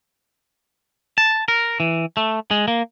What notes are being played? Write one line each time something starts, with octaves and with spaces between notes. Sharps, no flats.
A5
A#4
E3
A3
G#3
A#3